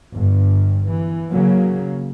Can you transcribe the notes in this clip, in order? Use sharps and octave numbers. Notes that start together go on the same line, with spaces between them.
G1 G2
E3
C#3 F#3 A#3